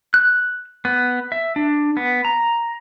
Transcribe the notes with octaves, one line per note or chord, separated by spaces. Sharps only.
F#6
B3
E5
D4
B3
A#5